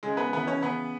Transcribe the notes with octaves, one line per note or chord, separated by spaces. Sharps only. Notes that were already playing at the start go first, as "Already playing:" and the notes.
C#3 G#3 G#4
B3 B4
E3 B3 B4
C#4 C#5
C#3 B3 B4